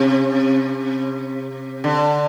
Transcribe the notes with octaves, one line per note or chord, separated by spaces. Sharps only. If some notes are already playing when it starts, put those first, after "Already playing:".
Already playing: C3
D3